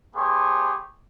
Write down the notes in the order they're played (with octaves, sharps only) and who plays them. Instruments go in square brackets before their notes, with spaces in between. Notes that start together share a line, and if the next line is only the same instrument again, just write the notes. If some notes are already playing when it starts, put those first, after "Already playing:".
[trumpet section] A3 B3 G4 G#4 C#5 C6